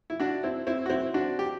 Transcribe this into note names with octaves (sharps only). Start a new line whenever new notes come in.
E4
D4 F#4
C4 E4
C4 E4
F#4
C4 E4
D4 F#4
G4